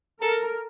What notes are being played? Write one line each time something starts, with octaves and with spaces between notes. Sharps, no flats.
A4 A#4